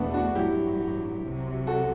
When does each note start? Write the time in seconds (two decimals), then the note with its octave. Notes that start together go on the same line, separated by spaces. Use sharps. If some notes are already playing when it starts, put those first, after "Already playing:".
Already playing: E2 B2 A3 B3 C4 D4
0.14 D4 F#4
0.35 A1 G2 F#3 E4 G4
1.24 C2 C3 F#3
1.67 F#4 A4